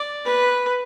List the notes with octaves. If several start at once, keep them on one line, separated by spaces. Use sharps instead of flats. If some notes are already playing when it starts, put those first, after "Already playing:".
Already playing: D5
B4